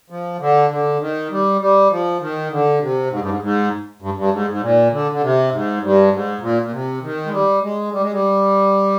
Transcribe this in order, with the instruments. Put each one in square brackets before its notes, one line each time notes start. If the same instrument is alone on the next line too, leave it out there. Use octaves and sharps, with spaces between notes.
[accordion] F3
D3
D3
D#3
G3
G3
F3
D#3
D3
C3
G#2
G2
G#2
G#2
G2
G2
G#2
G#2
A#2
D3
D3
C3
G#2
G2
G#2
A#2
A#2
C3
D#3
G#3
G3
G#3
G3
G#3
G3